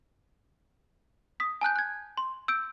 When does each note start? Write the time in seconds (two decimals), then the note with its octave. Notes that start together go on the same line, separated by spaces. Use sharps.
1.40 D#6 B6
1.61 G#5 A5 F#6 G6
1.76 F#6 G#6
2.17 C6
2.48 E6 G6 D7